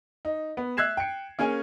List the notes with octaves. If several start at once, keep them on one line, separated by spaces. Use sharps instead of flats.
D#4
B3
E5 E6 F#6 G#6 C7 E7
G5 C#7
A#3 C#4 G#4 G#5